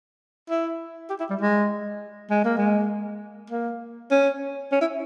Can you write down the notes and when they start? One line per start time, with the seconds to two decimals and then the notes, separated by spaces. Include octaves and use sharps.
0.50 E4
1.10 G4
1.20 E4
1.30 G3
1.40 G#3
2.30 G#3
2.44 A#3
2.58 G#3
3.50 A#3
4.11 C#4
4.72 C#4
4.81 E4